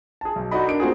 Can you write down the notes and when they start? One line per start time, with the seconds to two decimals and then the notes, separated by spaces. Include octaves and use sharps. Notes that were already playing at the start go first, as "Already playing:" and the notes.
0.21 G#4 A5
0.36 B1
0.51 D#4 F#4 A4 D5 D#5 B5
0.66 D4 A#4 D7
0.80 A#3 C4 F4 F#4 G#4